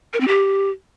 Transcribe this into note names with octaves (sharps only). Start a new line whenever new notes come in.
A#4
C4
G4